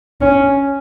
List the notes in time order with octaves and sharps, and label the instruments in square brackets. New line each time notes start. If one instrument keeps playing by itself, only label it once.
[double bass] C#4